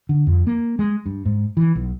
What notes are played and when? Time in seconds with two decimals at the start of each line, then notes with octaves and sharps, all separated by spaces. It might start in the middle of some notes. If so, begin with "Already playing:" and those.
0.09 D3
0.27 F2
0.47 A#3
0.79 G#3
1.06 G2
1.26 G#2
1.57 E3
1.75 B1